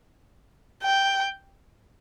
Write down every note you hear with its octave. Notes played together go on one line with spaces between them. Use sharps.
G5